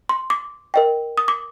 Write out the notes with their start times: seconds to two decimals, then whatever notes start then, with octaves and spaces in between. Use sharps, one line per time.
0.09 C6
0.30 D6
0.74 A#4 D#5 G5
1.17 D#6
1.28 D6